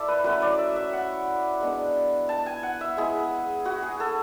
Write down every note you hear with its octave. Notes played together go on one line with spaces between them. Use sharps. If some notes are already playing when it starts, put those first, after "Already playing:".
Already playing: E4 A4 D5 E5
B4
F#3 A3 C#4 E4 B4
D5
E5
E5
F#5
G#3 B3 D4
A5
G#5
F#5
E5
G#3 B3 E4 G#4
F#4
G#4
A4